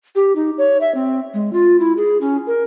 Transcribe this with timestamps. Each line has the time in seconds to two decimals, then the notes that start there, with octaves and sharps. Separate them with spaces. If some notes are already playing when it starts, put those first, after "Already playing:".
0.15 G4
0.36 D#4
0.58 C#5
0.81 E5
0.95 C4
1.34 G#3
1.53 F4
1.80 E4
1.97 G#4
2.21 C#4
2.47 A#4